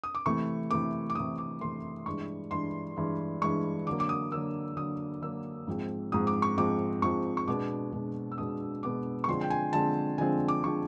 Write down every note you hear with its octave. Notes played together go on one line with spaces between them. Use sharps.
D#6
D6
C3 E3 A3 C#6
C3 E3 A3 D6
D6
C3 E3 A3 D#6
D6
C3 E3 A3 C6
G2 E3 G#3 C#6
G2 E3 G#3 C6
G2 E3 G#3
G2 E3 G#3 C#6
D3 F#3 A#3 D6
D6
D#6
D3 F#3 A#3 E6
D3 F#3 A#3 D#6
D3 F#3 A#3 E6
G#2 F3 G#3 C4
G#2 F3 G#3 C4 D#6
D6
C#6
G#2 F3 G#3 C4 D6
G#2 F3 G#3 C4 C#6
C#6
B2 G#3 B3 D4 D6
B2 G#3 B3 D4
E6
B2 G#3 B3 D4 D#6
B2 G#3 B3 D4 D6
C#6
D3 F3 G#3 C4 C6
G5
G#5
D3 F3 G#3 C4 A5
D3 F3 G#3 C4 G#5
D6
D3 F3 G#3 C4 C#6